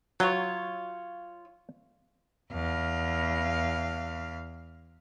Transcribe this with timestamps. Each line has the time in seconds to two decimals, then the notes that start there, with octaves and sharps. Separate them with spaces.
0.20 F#3 F4 C#5
2.51 E2 F5